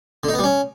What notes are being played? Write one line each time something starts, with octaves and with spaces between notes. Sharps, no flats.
D3
D#4
B3
G3
C#4